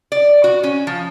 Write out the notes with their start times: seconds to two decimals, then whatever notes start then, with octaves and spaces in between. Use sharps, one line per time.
0.12 D5
0.44 F#4
0.63 C#4
0.87 F3